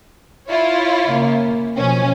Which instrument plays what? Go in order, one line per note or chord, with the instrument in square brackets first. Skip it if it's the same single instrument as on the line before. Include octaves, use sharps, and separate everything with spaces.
[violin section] E4 F4 C#5
[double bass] C#3 A#3
[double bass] B2 F3 [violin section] C#4